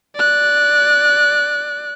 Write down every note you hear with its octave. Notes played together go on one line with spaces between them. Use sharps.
D5 F#6